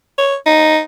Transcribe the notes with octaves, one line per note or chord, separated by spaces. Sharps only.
C#5
D#4